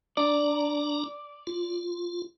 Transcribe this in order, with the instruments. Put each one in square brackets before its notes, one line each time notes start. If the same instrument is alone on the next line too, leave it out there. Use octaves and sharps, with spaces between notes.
[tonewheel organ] D4 A#5 [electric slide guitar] D5
[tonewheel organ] F4